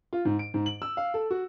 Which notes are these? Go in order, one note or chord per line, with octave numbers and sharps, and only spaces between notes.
F4
G#2
D7
G#2
F#7
E6
F5
A4
F#4